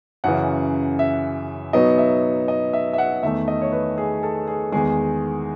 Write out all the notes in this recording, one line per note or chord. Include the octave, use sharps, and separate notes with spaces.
F#2 C#3 E3 F#5
E5
B2 F#3 B3 D#4 D#5
E5
D#5
E5
E5
F#5
E2 D#3 A3 E5
D#5
C#5
B4
G#4
A4
G#4
E2 D#3 G#3 G#4